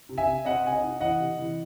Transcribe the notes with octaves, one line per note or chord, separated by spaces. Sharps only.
C3
E5 G#5
C3
C4 D#5 F#5
C3 G#5
D#5 F#5
D#4
E3 D#5 F#5
C3
E3